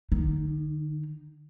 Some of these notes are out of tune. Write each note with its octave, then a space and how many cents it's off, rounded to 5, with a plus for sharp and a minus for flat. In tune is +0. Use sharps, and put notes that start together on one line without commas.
D3 +45 D#4 +0